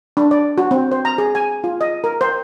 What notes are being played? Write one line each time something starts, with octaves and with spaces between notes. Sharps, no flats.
D4
D5
F#4
C4
C5
A#5
G#4
G#5
F4
D#5
A#4
C5